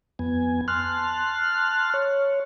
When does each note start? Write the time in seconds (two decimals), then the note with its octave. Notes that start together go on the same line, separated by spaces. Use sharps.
0.19 F2 B3 G#5
0.68 A5 C6 F6 F#6
1.94 C#5